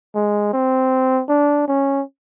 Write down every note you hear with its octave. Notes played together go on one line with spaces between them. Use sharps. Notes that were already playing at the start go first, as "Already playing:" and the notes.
G#3
C4
D4
C#4